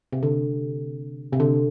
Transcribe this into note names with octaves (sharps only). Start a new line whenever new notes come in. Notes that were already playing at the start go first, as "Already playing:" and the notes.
C3
D3
C3
D3